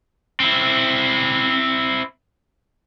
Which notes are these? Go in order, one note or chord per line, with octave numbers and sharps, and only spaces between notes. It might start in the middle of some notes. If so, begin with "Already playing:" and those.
C4 E4